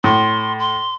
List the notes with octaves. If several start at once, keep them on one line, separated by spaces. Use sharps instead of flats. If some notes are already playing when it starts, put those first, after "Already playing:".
A2 C6
C6